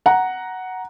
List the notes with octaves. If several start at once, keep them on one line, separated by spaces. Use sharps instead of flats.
F#5 A#5